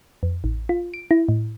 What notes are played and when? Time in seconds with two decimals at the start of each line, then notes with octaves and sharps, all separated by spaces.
0.23 F2
0.44 A1
0.69 F4
0.94 D7
1.11 E4
1.29 A2